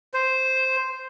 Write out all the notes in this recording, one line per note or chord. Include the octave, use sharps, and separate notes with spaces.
C5